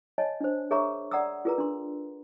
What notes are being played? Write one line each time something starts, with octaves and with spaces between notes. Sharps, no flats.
C#5 D#5 G#5 A5
D4 C5
G#4 A#4 C#5 E5 A#5 C#6
D5 F#5 A#5 D#6 E6
F4 G#4 A#4 B4 A#5
D4 C6